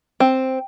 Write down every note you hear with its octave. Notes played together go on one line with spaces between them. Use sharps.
C4